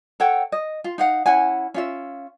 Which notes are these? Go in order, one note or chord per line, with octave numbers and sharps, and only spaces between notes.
A4 C#5 F#5 G5
D#5
F4
D#4 F5 F#5
C#4 E4 F#5 G#5
C#4 F4 E5